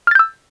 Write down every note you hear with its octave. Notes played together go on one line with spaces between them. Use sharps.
E6 F6 G6 A6